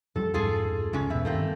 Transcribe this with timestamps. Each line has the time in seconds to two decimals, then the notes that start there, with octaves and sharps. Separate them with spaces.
0.16 F#2 F3 G3 A4
0.34 D1 F2 G#2 F4 G#4 A4
0.93 C#2 G#3 C#4
1.10 E2 B2 G3 E5
1.25 G2 D#3 A3 A#3 C4